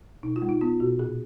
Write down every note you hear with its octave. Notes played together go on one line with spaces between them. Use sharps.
B2 D#4
F4
G#3
D#4
B3 F4
B2 F#4
A#2 G#4